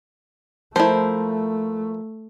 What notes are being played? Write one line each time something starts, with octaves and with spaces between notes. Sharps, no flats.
F3 A3 E4 A#4 C5